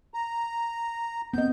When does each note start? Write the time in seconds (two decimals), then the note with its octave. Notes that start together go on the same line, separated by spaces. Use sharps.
0.14 A#5
1.33 B3 C4 D#5 G6